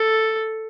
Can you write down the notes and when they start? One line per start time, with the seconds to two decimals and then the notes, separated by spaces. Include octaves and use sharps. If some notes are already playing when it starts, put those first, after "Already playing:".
Already playing: A4